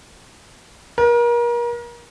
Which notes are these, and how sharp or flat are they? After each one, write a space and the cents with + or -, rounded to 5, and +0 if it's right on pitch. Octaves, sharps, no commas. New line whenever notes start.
A#4 +35